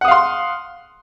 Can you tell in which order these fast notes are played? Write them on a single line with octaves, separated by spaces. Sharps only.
F#5 D#6 F5 C6